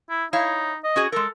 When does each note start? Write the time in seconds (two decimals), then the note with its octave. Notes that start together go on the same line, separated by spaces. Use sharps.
0.10 E4
0.33 D#4 E4 C#5 F5
0.84 D#5
0.96 C#4 F#4 G#4
1.12 G#3 A4 A#4